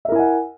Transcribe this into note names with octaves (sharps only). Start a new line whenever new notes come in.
E4 A#4 E5 F#5 G#5